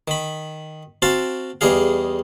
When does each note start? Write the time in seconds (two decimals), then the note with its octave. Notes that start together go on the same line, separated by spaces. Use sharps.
0.08 D#3 B5
1.02 C4 F#4 F5 A5
1.61 E2 G3 D#4 G#4 F5